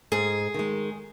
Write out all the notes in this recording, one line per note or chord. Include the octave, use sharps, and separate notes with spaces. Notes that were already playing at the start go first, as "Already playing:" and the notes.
G#2 G#4
D#3 G#3